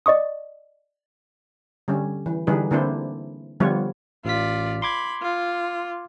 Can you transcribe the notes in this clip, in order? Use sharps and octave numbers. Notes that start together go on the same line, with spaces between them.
D5 D#5 C#6 D#6
D3 G3 C#4
E3
D3 E3 G3 D#4 G#4 B4
D3 A#3 C4 D4 E4 C5
D3 F3 G3 B3 F4 C#5
A1 F4 D5 B6
B5 C6 D6 G#6
F4